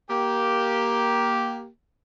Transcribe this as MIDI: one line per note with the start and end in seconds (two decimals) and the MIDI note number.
0.10 1.69 58
0.10 1.69 67